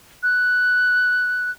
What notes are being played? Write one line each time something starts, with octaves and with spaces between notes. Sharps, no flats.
F#6